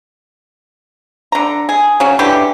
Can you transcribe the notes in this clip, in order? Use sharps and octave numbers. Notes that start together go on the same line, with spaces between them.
D3 A#5
G#4
C#3 F#3 C#4
D3 E3 G4